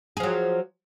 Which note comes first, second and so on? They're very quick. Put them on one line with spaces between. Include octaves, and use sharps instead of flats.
G#4 F3 F#3